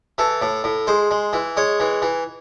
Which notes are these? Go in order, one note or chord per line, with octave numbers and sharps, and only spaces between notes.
E3 A4
A2
A2
G#3 C5
G#3
E3
G#3 C#5
E3
E3